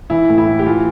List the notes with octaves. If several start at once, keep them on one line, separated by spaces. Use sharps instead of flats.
E3 E4
A2
E4
A2
G4
E3 F4